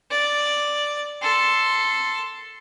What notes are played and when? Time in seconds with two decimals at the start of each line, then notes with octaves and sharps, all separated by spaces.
0.11 D5
1.22 A4 C6